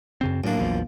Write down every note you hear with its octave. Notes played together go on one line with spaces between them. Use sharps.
F#2 C#3 C4
F#2 A2 A#3 C4 D4
A#1 E2 F3